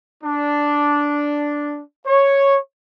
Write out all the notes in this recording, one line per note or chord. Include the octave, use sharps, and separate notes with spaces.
D4
C#5